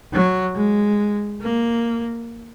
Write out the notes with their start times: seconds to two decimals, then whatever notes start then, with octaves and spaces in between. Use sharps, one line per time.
0.13 F#3
0.55 G#3
1.42 A#3